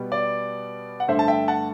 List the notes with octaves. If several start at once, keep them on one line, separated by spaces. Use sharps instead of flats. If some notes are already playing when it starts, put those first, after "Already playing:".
Already playing: B2 G3 B3
D5
F#5
G2 D3 A3 C5 E5
A5
E5 G5
F#5 A5